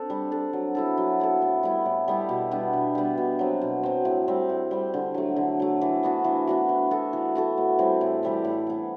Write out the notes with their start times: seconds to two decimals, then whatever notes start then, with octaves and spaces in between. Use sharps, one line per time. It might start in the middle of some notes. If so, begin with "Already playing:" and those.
Already playing: C4 D4 A4
0.10 G3
0.32 D4 A4
0.53 F#3
0.75 B3 E4 A4
0.98 F#3
1.20 B3 E4 A4
1.42 A2
1.63 G3 B3 E4
1.86 A2
2.08 G3 B3 E4
2.29 B2
2.51 G3 B3 D4
2.73 B2
2.95 G3 B3 D4
3.17 B2
3.39 F#3 C4
3.61 B2
3.83 F#3 C4
4.05 A2
4.28 G3 C4
4.49 A2
4.71 G3 C4
4.94 D3
5.14 F#3 A3
5.36 D3
5.60 F#3 A3
5.81 E3
6.03 B3 D4 F#4
6.24 E3
6.47 B3 D4 F#4
6.69 E3
6.91 B3 F#4 A4
7.13 E3
7.35 B3 F#4 A4
7.57 A2
7.79 E3 G3 C4
8.01 A2
8.23 E3 G3 C4
8.45 A2
8.67 E3 B3